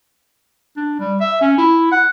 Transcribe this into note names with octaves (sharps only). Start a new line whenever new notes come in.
D4
G3
E5
C#4
E4
F#5